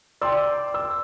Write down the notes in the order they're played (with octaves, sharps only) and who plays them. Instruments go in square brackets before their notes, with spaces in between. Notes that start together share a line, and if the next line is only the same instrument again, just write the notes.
[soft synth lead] D5 [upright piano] G5 C6 E6
[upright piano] E6